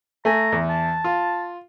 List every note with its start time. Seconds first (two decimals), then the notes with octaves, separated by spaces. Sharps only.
0.25 A3 G#5 A#5
0.52 E2
0.69 A5
1.04 F4